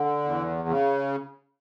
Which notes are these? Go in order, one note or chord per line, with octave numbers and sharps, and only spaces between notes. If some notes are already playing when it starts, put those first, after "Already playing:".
Already playing: D3
E2
C#3